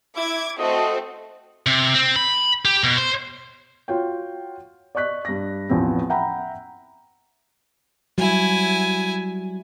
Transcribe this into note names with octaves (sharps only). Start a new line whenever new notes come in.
E4 D6 G#6
A3 C4 F#4 A4 D#5
C3
C4
B5
G4
B2
C5
F4 F#4 C#5 G5
D5 D#5 C#6 F#6 B6
G2 A#6
A1 E2 F3 B3 C4
E5 F#5 G5 A#5 B5
F#3 G3 E4 F#4 G#5